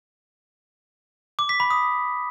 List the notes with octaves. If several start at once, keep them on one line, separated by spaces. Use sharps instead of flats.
D6
B6
B5
D#6